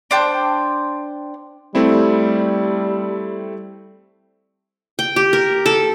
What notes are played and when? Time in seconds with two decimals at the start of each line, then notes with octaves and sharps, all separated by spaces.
0.11 D4 C5 G5 A5
1.75 G3 A3 C4 E4
4.99 G5
5.16 G4
5.33 A#4
5.66 A4